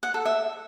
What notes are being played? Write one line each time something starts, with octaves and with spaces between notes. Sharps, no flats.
F#5
A4
E5